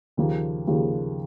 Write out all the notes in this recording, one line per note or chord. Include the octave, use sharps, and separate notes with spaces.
D#2 C#3 F3 A#3
D#2 C#3 F3 A#3